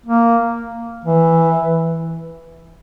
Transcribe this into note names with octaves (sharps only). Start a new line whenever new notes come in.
A#3
E3